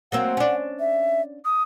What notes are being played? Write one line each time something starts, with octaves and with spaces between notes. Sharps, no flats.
F#3 A#3 C4 F#5
C#4 D4
E5
D#6